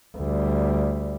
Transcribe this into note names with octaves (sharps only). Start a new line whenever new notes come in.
D2 G3